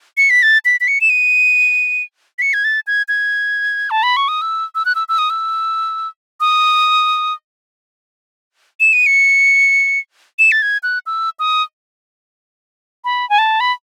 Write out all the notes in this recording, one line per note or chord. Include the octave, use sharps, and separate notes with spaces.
C#7
B6
A6
B6
B6
C#7
E7
D#7
B6
C#7
G#6
A6
G#6
G#6
A5
B5
C#6
D#6
E6
E6
F#6
E6
E6
D#6
E6
D#6
E7
D#7
C#7
E7
A6
G#6
F#6
E6
D#6
B5
G#5
A5
B5